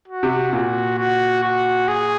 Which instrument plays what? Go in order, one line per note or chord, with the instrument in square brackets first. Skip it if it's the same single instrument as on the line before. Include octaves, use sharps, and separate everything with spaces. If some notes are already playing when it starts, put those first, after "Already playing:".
[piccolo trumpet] F#4
[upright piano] C3
[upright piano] A#2 [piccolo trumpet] F#4
[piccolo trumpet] F#4
F#4
G#4